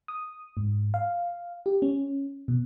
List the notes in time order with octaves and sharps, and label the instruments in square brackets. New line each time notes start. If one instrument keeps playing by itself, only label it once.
[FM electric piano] D#6
G#2
F5
G4
C#4
B2